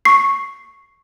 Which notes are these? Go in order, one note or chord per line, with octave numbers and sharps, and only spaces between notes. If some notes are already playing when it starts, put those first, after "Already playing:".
C#6 C7